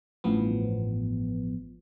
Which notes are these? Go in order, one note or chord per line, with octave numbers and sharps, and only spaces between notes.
A1 G2 F3 B3